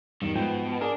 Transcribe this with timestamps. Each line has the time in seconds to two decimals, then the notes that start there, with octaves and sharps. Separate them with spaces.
0.22 E2 G2 D#3
0.35 G#2 B2 F3 G5
0.81 D4 G#4 A#4